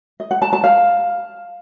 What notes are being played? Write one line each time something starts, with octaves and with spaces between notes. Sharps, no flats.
D#5
F#5
A5
A5
F5